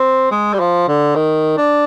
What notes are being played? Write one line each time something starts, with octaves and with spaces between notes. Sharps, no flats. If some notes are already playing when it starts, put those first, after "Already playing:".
Already playing: C4
G#3
G3
F3
D3
D#3
D4